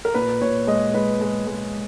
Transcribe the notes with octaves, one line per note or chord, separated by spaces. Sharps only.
A#4
A#2 B4
A#2 C#5
G#3 D#5
G#3 B4
G#3
G#3